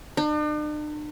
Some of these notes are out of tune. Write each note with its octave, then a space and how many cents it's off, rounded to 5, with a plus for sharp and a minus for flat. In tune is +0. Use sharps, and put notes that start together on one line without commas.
D4 +45